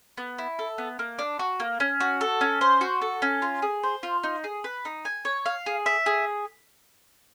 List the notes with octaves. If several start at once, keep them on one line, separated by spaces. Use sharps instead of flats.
B3
E4
A4
B3
A#3
D4
F#4
A#3
C#4
F#4
A4
C#4
C5
F#4
A4
C#4
F4
G#4
C5
F4
D#4
G#4
B4
D#4
G#5
C#5
F5
G#4
E5
G#4